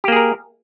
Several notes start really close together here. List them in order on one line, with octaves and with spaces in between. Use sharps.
G4 A#3 G#4 A#4